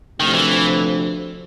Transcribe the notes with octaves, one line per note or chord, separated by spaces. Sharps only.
D2 C3 D#3 F3
E3